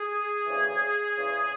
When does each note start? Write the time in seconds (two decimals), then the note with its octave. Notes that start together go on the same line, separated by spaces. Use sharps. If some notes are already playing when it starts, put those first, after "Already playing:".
Already playing: G#4
0.45 D2 C#3 E3
1.16 E2 C#3 E3